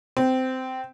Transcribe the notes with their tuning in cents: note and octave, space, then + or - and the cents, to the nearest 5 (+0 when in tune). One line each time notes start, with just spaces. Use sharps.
C4 -15